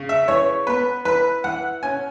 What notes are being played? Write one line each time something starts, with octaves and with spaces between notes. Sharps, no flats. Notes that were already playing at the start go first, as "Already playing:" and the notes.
Already playing: C#3
E5
E3 C#5
B3 B4
E3 B4
E3 F#5
C#4 G#5